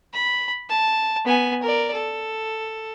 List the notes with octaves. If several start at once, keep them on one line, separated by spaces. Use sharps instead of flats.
B5
A5
B3 G#5
A#4 D5
A4